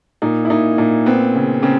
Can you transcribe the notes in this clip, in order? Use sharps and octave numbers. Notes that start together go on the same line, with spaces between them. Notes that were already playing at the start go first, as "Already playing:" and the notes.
A#2 D#4
E4
A#2 D#4
A#2 D#4
B3 C4
C#3
C#3 C4